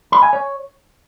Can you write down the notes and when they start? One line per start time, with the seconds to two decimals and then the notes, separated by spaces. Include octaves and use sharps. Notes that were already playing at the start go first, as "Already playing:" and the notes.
0.12 B5
0.23 G#5
0.33 C#5